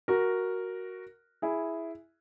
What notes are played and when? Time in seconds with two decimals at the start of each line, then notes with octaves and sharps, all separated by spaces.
0.08 F#4 A#4
1.42 E4 G#4